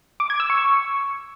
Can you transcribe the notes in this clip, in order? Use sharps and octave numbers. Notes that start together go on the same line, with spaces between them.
D6
G#6
E6
C#6